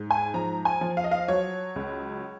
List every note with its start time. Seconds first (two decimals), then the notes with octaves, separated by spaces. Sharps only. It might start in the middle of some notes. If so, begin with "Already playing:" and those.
Already playing: G#2
0.11 G#5
0.34 F3 A#5
0.65 G#5
0.81 F3
0.97 F5
1.04 D#5
1.11 F5
1.28 F#3 C#5
1.76 C#2